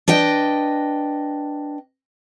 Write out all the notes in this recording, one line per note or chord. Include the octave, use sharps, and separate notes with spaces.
D4 B4 D#5 G5